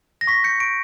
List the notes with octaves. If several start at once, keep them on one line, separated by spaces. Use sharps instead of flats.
A#6
C#6 B6
G6 C#7
C#6 D7